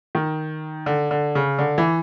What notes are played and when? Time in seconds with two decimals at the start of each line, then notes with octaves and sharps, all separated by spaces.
0.15 D#3
0.86 D3
1.11 D3
1.35 C#3
1.59 D3
1.78 E3